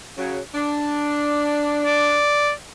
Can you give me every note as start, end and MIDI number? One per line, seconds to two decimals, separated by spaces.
0.18 0.40 49
0.18 0.40 54
0.55 2.17 62
1.85 2.51 74